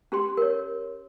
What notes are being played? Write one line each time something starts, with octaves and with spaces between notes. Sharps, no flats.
C#4 G4 C6
A#4 C#5